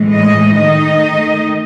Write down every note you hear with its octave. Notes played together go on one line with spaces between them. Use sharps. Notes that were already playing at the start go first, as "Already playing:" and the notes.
Already playing: A2 E3 G#3
D#5
D#3 A3 D#4 D#5